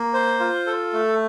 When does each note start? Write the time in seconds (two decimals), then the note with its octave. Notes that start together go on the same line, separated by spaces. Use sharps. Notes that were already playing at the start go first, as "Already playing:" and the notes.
Already playing: A#3
0.14 C5
0.40 F4
0.66 A4
0.93 A3